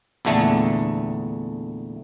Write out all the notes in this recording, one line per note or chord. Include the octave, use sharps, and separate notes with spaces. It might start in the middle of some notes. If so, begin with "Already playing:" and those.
A#1 E2 D3 A3